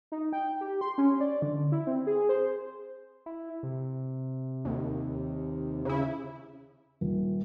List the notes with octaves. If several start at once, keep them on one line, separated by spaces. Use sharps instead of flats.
D#4
G5
G4
C6
C#4
D5
D3
E4
C4
G#4
C5
E4
C3
D#2
C#3 E4
D#1